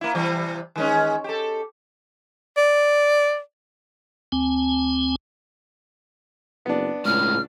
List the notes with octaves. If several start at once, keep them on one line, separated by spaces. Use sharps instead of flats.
A#3 E4
C3 E3 G3
D#3 G#3 C#4
G4 A4
D5
D2 C4 G#5
F#1 B3 D4
C#2 A2 G#3 F6